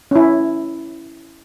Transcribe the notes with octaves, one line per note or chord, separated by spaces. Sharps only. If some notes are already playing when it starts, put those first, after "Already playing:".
C#4 E4